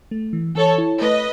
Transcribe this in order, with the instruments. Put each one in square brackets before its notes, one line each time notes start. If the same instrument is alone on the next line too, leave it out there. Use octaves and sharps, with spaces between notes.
[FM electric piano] A3
E3
[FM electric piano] E3 [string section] A4 C#5
[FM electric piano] E4
[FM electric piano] A3 [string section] B4 D#5